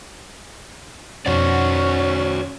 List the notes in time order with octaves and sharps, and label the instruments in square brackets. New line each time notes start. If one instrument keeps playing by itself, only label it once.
[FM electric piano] F2 B2 F#5 [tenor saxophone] C#4 [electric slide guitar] F#4 C5 D5